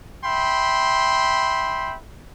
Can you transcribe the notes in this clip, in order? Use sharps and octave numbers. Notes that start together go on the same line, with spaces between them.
E5 G5 B5 C6